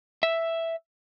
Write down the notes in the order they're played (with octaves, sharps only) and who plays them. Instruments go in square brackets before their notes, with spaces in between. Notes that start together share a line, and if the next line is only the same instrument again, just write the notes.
[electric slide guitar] E5